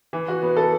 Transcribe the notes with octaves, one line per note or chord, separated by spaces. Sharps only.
E3
F#4
B3
A4